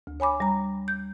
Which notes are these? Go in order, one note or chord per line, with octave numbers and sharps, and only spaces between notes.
D2
C#5 G#5 B5 D6
G3 A#5
G6